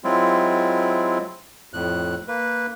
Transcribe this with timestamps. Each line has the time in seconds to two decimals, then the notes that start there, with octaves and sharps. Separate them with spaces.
0.04 F#3 G#3 C4 E4 F4
1.73 F2 A2 F#6
2.28 A#3 B4